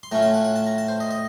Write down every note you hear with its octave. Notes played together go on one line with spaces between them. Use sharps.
C6
A2 A3 C#4 F4 A#5
A5
F#5
F#5
A5
A#5
A5
C5
D#5
D#5